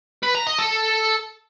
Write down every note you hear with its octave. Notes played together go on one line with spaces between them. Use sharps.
B4
A#5
D#5
A4